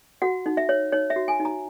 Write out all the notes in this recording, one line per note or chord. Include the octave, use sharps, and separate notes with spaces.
F#4 F#5
D#4
E5
C#5
D#4 C#5
E5
F#4
G#5
D#4
A#5